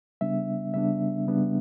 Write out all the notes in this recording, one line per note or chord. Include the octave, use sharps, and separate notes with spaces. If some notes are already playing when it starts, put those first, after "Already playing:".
C#3 G3 B3 D4 E5
C#3 G3 B3 D4 E5
C#3 G3 B3 D4